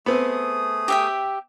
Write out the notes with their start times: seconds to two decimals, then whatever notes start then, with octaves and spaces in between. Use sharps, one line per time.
0.06 A3 B3 C4 G#4 D#6
0.88 G4 E5 G5